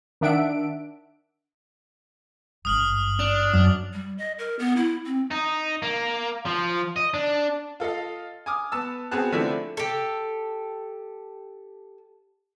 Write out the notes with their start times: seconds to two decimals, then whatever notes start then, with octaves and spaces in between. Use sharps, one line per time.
0.21 D#3 D4 E5 F#5 D7
2.65 G#1 G2 D#6 F6 F#7
3.19 D4 F7
3.53 F#2 D#6
3.93 G3
4.18 D#5
4.39 A#4
4.59 B3
4.76 E4
5.06 C4
5.31 D#4
5.82 A#3
6.45 F3
6.96 D#5
7.14 D4
7.80 F4 A4 D#5 F5
8.46 G#5 D6 D#6 F6
8.72 B3 A5 E6
9.11 B3 C4 F#4 G#4 A5 F#6
9.32 D3 F3 A3 C4 D4 E4
9.77 G4 A4